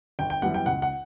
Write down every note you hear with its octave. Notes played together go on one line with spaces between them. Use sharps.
G1 G5
G5
F#2 E3 G3 B3 F#5
G5
C#2 F#5
F#5